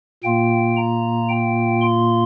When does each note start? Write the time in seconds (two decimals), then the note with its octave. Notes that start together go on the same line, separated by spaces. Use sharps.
0.24 A#2 A#3 F4 G5
0.77 A#5
1.29 G5
1.81 C6